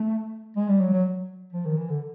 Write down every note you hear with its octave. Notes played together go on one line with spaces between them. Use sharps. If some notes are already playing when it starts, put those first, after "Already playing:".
Already playing: A3
G#3
G3
F#3
F#3
F3
D#3
E3
D3